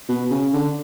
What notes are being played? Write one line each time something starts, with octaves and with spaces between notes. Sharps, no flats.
B2
C#3
D3